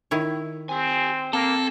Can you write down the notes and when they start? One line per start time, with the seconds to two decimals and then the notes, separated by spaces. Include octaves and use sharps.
0.11 D#3 E4 C#5
0.69 C4 G4 G#5
1.33 A#3 C4 A4